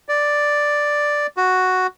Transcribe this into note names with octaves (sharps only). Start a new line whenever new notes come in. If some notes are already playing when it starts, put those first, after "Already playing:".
D5
F#4